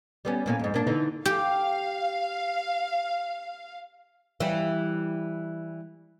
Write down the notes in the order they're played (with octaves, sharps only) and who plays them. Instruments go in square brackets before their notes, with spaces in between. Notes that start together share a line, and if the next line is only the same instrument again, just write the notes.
[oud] G3 B3 C#4
A2 A#3 C#4
F2 G#2
A#3 D4
D3 E3 D#4
[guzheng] G4 [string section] F5
[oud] E3 G3